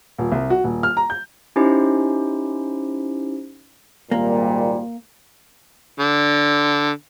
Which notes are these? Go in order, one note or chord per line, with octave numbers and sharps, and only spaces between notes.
D#1
C2
F#4
D#1
F6
A#5
G6
C#4 D#4 E4 G4 C5
G#1 A#2 G3 A#3
D3